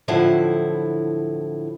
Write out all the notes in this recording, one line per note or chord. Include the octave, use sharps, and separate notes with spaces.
A2 D3 F3 F#3 E4